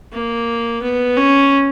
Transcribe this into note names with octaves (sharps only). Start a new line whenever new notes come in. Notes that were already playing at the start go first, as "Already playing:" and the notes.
A#3
B3
C#4